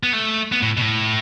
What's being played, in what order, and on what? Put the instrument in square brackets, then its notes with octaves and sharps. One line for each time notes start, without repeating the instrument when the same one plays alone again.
[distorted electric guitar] B3
A3
B3
A2
B2
A2